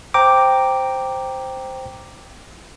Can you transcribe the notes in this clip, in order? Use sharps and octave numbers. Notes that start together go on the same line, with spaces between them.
C5 G5 A#5 D6